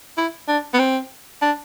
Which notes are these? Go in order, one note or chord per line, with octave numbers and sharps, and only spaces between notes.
E4
D4
B3
C4
D4